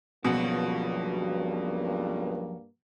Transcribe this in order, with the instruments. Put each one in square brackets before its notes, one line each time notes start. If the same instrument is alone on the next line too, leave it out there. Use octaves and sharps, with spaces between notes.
[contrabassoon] C#2 [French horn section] G2 A#3 [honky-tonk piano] B2 [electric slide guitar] F3 F#3 F#4